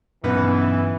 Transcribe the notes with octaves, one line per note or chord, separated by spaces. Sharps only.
B1 G2 E3 B3 C#4 B4 F#5